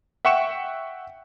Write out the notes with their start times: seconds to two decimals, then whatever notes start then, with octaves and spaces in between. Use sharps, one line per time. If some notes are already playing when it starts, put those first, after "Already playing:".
0.25 E5 F#5 G5 C#6 C#7 E7